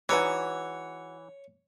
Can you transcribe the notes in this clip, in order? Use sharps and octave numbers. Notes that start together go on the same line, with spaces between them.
E3 G#3 D#4 F#4 B4 C#5 D5